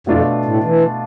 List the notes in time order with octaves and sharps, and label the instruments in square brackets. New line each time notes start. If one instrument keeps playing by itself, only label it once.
[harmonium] F2 [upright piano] B2 A3 D4 F4
[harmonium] A2
E3